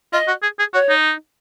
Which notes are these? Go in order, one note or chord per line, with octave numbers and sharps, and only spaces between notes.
F4 D#5
F#4
G#4
G#4
F#4 C#5
D#4